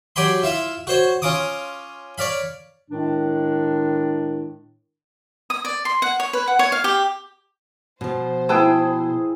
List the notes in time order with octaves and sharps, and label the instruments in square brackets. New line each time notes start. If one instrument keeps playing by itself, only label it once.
[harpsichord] F#3 G4 D5 G#5 B5 C6
E4 F4 E5
F#4 C5 C#5
C#4 F4 A#5 D6 D#6
C#5 D5 F5 B5
[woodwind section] A2 D#3 G#3 D4
[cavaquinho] D#6
D5
C6
F#5
C#5
B4
F#5
C#5
F5
G4
[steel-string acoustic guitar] B2 F3 [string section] C5
[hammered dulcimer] E4 G#4 [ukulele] B4 G5 A5